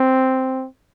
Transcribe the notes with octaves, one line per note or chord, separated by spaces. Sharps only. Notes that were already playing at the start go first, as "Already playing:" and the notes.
Already playing: C4